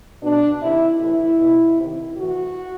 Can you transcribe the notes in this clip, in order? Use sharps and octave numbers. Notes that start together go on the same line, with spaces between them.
B2 D4
C3 D#3 E4
A2 E3 E4
B2
C3 D#3
A2 E3 F#4